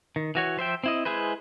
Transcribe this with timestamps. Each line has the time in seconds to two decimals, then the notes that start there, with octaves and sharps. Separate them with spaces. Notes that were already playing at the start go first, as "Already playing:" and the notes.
0.16 D#3
0.35 E3 F#4 C#5
0.57 F3 C5 E5 G5
0.84 C4 E4 D#5
1.05 G#3 E4 G#4 B4 C5